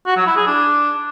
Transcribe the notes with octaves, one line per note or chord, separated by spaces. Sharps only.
F#4
F#3
E4
G#4
D4